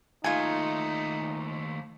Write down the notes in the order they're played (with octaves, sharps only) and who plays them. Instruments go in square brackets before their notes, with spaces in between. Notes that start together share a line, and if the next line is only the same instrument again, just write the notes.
[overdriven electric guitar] D#2 A3 [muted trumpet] D#4 [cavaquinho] F4 G#5